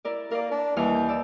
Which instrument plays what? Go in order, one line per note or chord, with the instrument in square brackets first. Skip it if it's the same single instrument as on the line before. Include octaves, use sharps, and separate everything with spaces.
[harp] E4 A#4 D5
[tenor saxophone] A#3 [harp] A#4 D5
[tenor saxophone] D4
[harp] D#2 G3 F6 [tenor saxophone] E3
[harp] G6
D5 E6